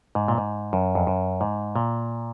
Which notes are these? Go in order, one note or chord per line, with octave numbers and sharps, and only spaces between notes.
G#2
A#2
G#2
F#2
F2
F#2
G#2
A#2